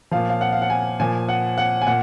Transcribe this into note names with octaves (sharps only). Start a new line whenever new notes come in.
A#2 F3 F5
F5
F#5
F5
F#5
G#5
A#2 F3 G#5
F#5
F#5
G#5
A#2 F#5